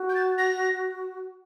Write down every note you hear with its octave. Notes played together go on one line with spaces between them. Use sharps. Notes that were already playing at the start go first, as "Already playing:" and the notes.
Already playing: F#4
G6
A6
A#6